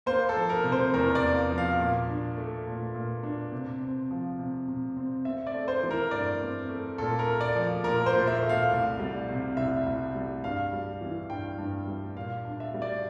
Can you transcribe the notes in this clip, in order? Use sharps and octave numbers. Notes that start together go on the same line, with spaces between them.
A#3 C5
A4
F3
A#4
C3
C5
E2 A#4
D5
A#3
F3
F5
A#2
D4
A3
A#2
A#2
D4
C3
C4
F3
C3
C3
C4
C4 E5
D5
A3
C5
E3
A#4
G2 D5
C4
A3
A#2 A4
A#4
A3
D5
F3
A#2 A#4
C5
A#2
E5
A3
F5
C2
G3
C3
C2 E5
C2
G3
G2 F5
G3
E3
G2 G5
G2
G3
A#2 F5
D4
E5
G3
D5